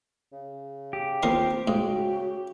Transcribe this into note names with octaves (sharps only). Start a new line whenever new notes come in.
C#3
G4
D#2 C4 F4 A#4 C6
G#2 C#3 F#4